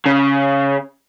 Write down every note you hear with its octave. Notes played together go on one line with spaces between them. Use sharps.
C#3